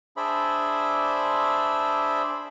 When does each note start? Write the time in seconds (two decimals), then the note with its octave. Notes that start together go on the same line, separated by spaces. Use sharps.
0.17 D4 G#4 C5 D5 E5 B5